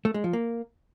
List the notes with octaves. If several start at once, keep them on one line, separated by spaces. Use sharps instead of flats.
A3
G#3
F3
A#3